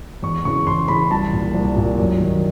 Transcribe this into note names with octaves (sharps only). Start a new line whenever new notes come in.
E2 C#6
C#3 E3 C#6
E2 C6
C#3 E3 B5
C2 A5
A#2
C2
A#2
F#2
D#3